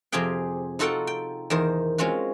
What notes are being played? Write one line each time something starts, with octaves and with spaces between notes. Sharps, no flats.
F2 C3 G4 G#4 F5 G5
D#4 F4 F#4 A4 F#5 G5
G5
E2 D#3 A#4 C5
G#3 C4 C#4 F4 F#4